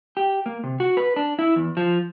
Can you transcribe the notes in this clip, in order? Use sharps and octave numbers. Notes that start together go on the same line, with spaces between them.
G4
A#3
C3
F#4
B4
D4
E4
E2
F3